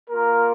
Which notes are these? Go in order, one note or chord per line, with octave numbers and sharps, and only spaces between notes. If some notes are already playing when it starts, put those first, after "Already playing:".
A#3 F4 A#4